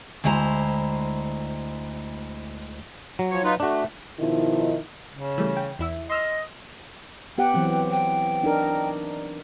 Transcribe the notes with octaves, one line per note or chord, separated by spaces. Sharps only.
D2 G#3 E4 C5 A#5
F#3
F3 C#5
D#4 F4 B4
A3 D4 F#4
B2 D#3 F3 D#4 E4
C#3
E3 G3 A3
G5
E2 E4 E5
D#5 C6 E6 F6
B3 G4 F#5 G5
E3 F#3 C4
G5
D4 D#4 A#4